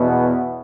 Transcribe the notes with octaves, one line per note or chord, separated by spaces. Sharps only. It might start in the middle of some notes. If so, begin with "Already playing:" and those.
Already playing: E2 B2 B3